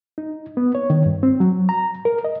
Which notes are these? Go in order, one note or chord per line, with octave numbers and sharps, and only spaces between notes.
D#4
B3
C#5
D#3
G2
C4
F#3
A#5
A#4
D#5